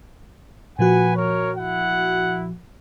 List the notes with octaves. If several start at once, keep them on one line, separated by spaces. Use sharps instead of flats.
A#2 F3 F#4 B4 F#5 G#5
A#4 C#5
E4 F#5